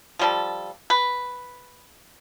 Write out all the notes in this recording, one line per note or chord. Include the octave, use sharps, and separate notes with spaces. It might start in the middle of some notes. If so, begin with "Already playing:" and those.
F3 G3 A4
B4